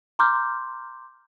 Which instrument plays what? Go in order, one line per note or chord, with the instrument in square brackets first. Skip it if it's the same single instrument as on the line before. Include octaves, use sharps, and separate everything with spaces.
[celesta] A#5 C6 D6 F6 G6